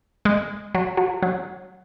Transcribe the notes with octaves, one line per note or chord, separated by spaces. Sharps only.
G#3
F#3
F#3
F#3